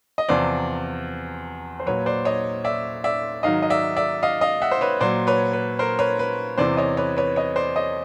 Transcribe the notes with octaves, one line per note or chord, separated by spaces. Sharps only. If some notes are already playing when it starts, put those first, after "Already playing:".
D#5
E2 C3 F3 C5 D5
C5
A#2 F#3 B4 C#5
C5 D5
C#5 D#5
D5 E5
D5 E5
G#2 D#3 F#3 D#5 F5
D#5
D5 E5
D5 E5
D#5 F5
D#5 F5
E5 F#5
C5
B4 C#5
A#2 F#3 C5 D5
B4 C#5
B4
A#4 C5
B4 C#5
B4
E2 C3 E3 C5 D5
C#5 D#5
B4 C#5
B4 C#5
C#5 D#5
C5 D5
C#5 D#5